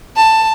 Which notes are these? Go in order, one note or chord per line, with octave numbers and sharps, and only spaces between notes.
A5